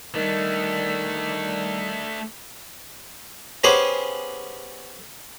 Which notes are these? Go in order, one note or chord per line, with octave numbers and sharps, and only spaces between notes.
D#3 G3 A3 D4
B3 C#4 G4 G#4 C5 C#5